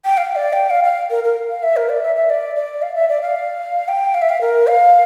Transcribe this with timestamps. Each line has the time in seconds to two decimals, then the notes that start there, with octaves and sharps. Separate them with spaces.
0.05 G5
0.17 F5
0.36 D5
0.53 G5
0.70 F5
0.84 F5
1.10 A#4
1.24 A#4
1.50 F5
1.63 E5
1.77 A#4
1.89 D5
2.03 E5
2.16 E5
2.30 D5
2.56 D5
2.82 F5
2.95 E5
3.09 D5
3.22 F5
3.88 G5
4.14 F5
4.22 E5
4.29 F5
4.41 A#4
4.67 F5